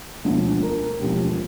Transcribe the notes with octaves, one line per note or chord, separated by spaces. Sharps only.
E1 D2 D3 F3
A#4
E1 D2 D3 F3 G4